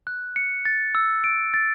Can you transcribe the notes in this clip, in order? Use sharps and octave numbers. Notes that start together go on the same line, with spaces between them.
F#6
C#7
A6
E6
D7
A6